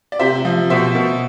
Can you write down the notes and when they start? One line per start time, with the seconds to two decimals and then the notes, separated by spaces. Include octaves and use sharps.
0.12 D5
0.19 C3 C5 E5
0.45 F3
0.70 B2 C5 E5
0.95 B2